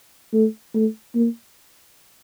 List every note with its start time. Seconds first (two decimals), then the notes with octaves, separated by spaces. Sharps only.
0.33 A3
0.74 A3
1.15 A#3